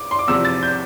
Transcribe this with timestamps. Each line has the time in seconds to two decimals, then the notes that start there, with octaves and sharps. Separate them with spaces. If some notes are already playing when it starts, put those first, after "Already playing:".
Already playing: D6
0.11 C6
0.19 D6
0.28 E2 C3 F3 E6
0.45 A6
0.63 G6